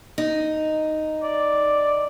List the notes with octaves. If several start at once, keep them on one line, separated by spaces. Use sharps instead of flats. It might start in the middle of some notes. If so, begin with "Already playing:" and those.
D#4
D5